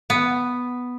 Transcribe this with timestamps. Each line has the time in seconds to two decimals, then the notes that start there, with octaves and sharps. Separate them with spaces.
0.10 B3